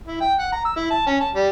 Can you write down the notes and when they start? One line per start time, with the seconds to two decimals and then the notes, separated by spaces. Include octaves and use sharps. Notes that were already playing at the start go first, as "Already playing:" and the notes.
0.07 E4
0.21 G5
0.39 F#5
0.52 A#5
0.65 E6
0.77 E4
0.91 A5
1.07 C#4
1.21 A5
1.35 G3